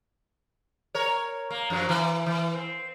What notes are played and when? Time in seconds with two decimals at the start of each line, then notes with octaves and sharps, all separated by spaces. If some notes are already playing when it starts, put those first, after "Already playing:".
0.95 A#4 C#5
1.50 A#3
1.70 F#2 F3 F#3
1.89 E3
2.26 E3
2.55 C4